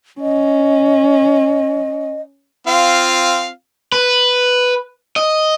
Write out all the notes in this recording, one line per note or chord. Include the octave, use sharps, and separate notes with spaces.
C#4 D#5
C4 F4 F5
B4
D#5